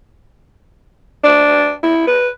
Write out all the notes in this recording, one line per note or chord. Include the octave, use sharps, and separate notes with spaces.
D4
E4
B4